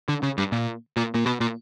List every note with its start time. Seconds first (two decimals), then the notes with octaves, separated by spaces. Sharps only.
0.09 D3
0.23 C#3
0.38 G2
0.52 A#2
0.97 A#2
1.15 A#2
1.26 B2
1.40 A#2